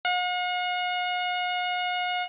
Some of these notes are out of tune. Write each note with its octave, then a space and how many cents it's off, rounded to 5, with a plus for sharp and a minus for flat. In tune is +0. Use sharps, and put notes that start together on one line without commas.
F#5 -45